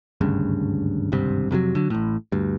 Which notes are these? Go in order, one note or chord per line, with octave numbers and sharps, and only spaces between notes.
G#1 D2 G2 C#3
G#1 C#2 G2 C3
F2 C3 D#3 F#3
D3 F#3
A1 A2
D2 G2